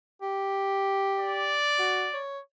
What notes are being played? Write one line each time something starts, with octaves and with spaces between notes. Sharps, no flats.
G4
D5
F#4
C#5